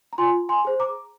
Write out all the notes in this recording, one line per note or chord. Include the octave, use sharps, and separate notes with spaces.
A#5
F4 G#5 C6
G#5 C6
G#4 C5
A#5 D6